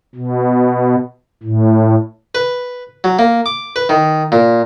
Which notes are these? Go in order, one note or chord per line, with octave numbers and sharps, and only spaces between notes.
B2
A2
B4
F#3
A#3
D6
B4
D#3
A#2